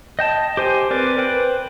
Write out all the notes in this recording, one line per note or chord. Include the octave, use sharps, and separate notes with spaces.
D#5 G5 A5
G4 C5 G#5
C4 A#4 B4 D5 G#5
B4 C5 G5